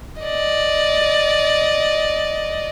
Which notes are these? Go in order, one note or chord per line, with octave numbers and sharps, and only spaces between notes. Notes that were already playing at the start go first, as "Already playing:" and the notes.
D5 D#5